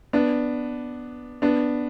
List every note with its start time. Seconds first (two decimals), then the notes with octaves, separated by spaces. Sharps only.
0.13 B3 D4
1.42 B3 D4